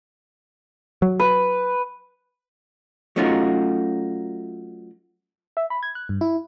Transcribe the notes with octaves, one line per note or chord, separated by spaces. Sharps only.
F#3
B4
F#3 A3 C#4 D#4 F4 F#4
E5
B5
G#6
F#6
G2
E4